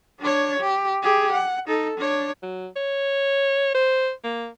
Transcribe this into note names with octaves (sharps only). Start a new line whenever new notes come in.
D4 C#5
G4
G4 G#4
F#5
D#4 A4
D4 C#5
F#3
C#5
C5
A#3